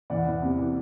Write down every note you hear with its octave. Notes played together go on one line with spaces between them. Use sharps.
E2 D5 F#5
E2
C3
E3